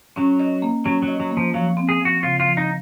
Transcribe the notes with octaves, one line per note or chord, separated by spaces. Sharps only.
F#3 C#4
D#5
A#3
F#3 C#4
F#3
D#5
F#3
A#3
F3
F3 F#3
C4
G#4
F3
F#4
C#3 F4
F4
F3
D#4